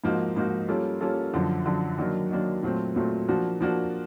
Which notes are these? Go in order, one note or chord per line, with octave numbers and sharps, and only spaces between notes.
G#2 F3 A#3 D#4 F#4
G#2 F3 A#3 D#4 F#4
G3 A#3 C#4 F4 A4
G3 A#3 C#4 F4 A4
F#2 D3 F3
F#2 D3 F3
D#3 F#3 A#3 D4
D#3 F#3 A#3 D4
A#2 F#3 A3 C4
A#2 F#3 A3 C4
F3 A#3 D4 F#4
F3 A#3 D4 F#4